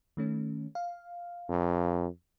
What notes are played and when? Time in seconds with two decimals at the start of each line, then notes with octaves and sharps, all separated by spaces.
0.17 D#3 A3 C#4
0.75 F5
1.49 F2